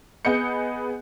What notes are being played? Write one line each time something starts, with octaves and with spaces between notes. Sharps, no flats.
B3 G#4 D#5 G6 C#7